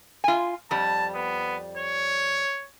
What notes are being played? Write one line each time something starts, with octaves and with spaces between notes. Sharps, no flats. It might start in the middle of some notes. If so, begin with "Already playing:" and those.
F4 G#5
F2 G3 A5
B3
C#5